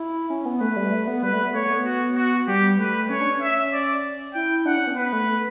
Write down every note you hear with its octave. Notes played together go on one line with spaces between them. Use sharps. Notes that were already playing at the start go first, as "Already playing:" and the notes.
Already playing: E4
C#4
B3
A3 B4
A3
G3
A3
B3
G3 B4
A3
B3
A3 C#5
B3
F#4
F#4
G3 G4
A3 B4
C#4 C#5
D4
C#4
E5
D5
E4 G5
D4 F#5
C#4
B3
B3 B4
A3
A3